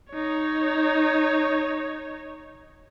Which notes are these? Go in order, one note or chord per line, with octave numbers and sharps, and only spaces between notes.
D#4 C#5